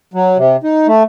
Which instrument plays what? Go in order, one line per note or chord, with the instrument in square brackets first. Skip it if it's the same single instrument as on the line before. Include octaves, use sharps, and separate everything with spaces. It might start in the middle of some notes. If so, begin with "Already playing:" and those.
[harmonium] F#3
C3
D#4
A3